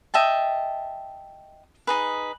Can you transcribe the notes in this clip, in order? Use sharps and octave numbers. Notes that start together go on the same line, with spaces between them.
D#5 E5 G5 A5
D#4 G#4 B4